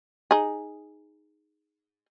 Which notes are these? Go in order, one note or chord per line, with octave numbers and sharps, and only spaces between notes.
D#4 G#4